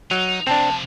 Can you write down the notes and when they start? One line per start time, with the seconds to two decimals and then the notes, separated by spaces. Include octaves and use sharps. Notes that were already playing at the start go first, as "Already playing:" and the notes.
0.11 F#3 D#4
0.47 C3 F3 C4 D4 A5